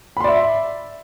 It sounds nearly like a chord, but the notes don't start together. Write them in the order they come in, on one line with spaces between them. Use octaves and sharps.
B5 C6 D5 E5